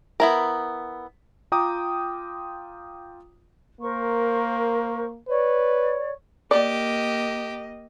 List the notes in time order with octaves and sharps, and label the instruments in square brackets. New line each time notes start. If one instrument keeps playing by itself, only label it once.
[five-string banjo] B3 E4 A#4
[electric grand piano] F4 G5 A#5 D6 D#6
[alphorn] A#3 [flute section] A#4 C5 C#6
[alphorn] B4 [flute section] C#5 D5
[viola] A#3 D#5 [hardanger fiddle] G4 [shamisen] D5